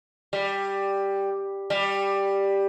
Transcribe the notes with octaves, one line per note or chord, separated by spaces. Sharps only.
G3
G3